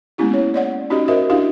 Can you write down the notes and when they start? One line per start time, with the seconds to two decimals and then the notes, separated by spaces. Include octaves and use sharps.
0.18 G#3 A#3 B3 C#4 E4 G4
0.34 C#5
0.54 C#5 D5 F#5
0.90 C#4 D#4 F#4 G4 D#5
1.08 F#4 A#4 C5 D#5 E5
1.29 D4 E4 F#4 G4 F5